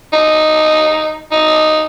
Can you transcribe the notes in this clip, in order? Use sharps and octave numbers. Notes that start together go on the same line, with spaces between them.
D#4
D#4